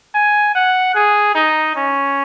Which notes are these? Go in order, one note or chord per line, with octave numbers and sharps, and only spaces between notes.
G#5
F#5
G#4
D#4
C#4